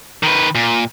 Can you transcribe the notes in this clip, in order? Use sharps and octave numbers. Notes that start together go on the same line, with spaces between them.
D#3 B4
A#2